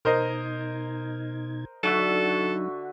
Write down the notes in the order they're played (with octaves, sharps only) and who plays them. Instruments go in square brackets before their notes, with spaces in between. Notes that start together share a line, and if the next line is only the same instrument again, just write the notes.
[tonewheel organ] B2 D#4 G#6 [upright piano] A#4 C5 D#5
[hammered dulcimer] D3 F#4 E5 [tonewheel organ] F#3 D#4 [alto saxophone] A4